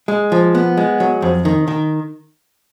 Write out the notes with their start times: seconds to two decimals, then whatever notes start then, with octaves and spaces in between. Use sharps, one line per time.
0.08 G#3
0.32 F3
0.55 B3
0.77 G#3
1.00 F#3
1.22 F2
1.45 D#3
1.68 D#3